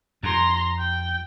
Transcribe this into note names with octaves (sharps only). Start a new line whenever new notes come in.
F2 A#5 C6
G5